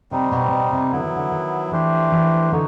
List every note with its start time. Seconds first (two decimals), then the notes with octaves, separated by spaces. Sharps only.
0.11 C3 G3 C4 D#4
0.32 B2
0.51 B2
0.72 C3
0.91 D3 F#3 B3 E4
1.04 D#3
1.16 D3
1.32 D#3
1.72 E3 A3 D4 G4 C5
2.12 E3
2.52 D3 D#4 F#4